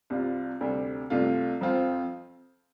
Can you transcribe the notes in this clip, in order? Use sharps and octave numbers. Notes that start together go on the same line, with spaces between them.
C2 C3 G3 F4
D2 C3 G3
C2 C3 A3 F4
F2 F3 C4 F4